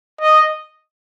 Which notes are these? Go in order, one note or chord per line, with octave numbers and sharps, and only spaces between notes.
D#5